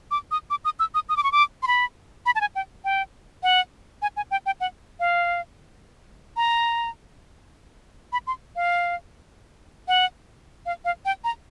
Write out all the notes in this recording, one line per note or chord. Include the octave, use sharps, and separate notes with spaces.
D6
D#6
D6
D#6
E6
D#6
D#6
D6
C#6
D6
C6
B5
B5
A5
G#5
G5
G5
F#5
G#5
G#5
G5
G5
F#5
F5
A#5
B5
C6
F5
F#5
F5
F5
G5
A#5